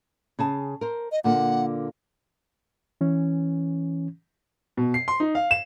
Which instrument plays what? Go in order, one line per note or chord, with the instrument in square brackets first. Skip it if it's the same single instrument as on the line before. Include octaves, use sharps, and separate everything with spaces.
[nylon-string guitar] C#3 G#4 A5
A#4 C5
[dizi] D#5
[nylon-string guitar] A#2 D3 A#3 [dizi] F#5
[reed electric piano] E3 C#4
[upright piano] B2
C7
C6
D#4
F5
E7